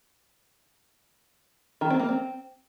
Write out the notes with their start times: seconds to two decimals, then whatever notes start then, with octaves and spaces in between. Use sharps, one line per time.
1.81 D#3
1.90 C4
2.00 A#3
2.09 C4